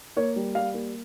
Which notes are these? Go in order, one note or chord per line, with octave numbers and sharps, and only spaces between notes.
A#3 C#5
G3
G3 F5
A#3